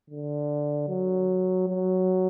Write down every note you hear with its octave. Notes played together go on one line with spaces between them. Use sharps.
D3
F#3
F#3